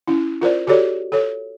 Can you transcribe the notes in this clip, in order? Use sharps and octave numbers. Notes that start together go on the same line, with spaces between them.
C#4 E4
F4 A#4 C5 D5
F#4 G4 A4 C#5 D5
A4 C#5